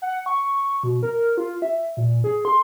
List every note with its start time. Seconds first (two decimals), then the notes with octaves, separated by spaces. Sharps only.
0.02 F#5
0.26 C#6
0.83 B2
1.03 A#4
1.37 F4
1.62 E5
1.97 A#2
2.24 G#4
2.45 C6